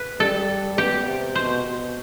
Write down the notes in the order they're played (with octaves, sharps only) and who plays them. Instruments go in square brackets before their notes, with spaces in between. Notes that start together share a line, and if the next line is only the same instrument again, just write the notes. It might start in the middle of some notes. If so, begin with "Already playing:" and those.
Already playing: [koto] B4
[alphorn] G3 [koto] A4
[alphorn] B3 [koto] G4
[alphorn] C3
[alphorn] B2 [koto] C5
[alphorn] B2